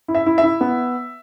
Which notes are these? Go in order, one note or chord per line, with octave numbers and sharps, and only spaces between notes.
E4
E5
E4
E5
E4
B3